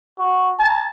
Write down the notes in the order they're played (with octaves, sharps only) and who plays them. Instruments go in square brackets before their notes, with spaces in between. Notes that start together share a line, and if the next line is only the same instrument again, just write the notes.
[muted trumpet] F#4
A5